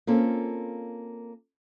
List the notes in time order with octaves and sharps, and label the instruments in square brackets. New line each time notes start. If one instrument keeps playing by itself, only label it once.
[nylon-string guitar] A#3 C4 C#4 F4 A4